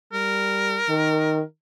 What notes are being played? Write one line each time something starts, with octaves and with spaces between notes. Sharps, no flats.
G3 A#4
D#3